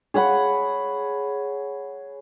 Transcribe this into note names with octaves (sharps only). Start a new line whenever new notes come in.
G#4 C#5 F#5 B5